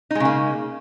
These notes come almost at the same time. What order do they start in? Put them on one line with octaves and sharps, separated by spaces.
D#4 G#3 C#3 A#3